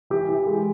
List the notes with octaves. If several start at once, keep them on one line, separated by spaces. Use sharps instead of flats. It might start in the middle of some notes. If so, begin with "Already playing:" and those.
E3 G4
E3
G#3